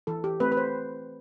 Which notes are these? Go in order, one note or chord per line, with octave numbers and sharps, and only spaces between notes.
E3 A4
G4
A3 C4 B4
B4
C5